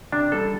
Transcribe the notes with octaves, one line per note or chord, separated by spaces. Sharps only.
C3 D4
G3 A4